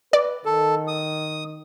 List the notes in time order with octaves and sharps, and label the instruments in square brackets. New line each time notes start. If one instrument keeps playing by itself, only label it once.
[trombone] B4 [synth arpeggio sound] D5
[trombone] D#3 [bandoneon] A4
[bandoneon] D#6